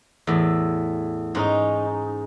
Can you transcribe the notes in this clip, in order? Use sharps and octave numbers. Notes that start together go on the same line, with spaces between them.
E2 A2
G#2 C#4 D#4